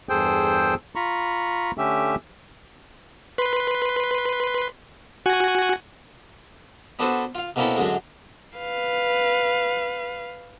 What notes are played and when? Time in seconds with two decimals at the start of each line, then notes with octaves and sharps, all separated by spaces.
0.09 E2 G2 G#4 A4 C5 G5
0.96 F4 A#5 B5 C#6
1.78 D3 A3 C#4 G4 E5
3.38 B4 C6
5.26 F#4 F#5 G#5
6.99 B3 D4 F#4 A4 B4 C5
7.35 F4 F5
7.56 B2 A#3 C4 C#4 E4 A4
7.77 F#2 D3 F#3 G#3
8.59 B4 F5